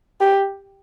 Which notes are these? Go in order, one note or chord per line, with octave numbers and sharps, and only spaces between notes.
G4